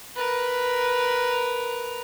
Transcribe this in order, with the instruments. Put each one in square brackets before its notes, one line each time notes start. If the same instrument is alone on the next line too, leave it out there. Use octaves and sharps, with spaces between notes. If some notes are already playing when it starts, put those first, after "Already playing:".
[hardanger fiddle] A#4 B4